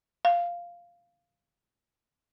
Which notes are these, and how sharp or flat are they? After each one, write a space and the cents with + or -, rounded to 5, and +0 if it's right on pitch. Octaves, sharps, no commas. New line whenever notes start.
F5 -5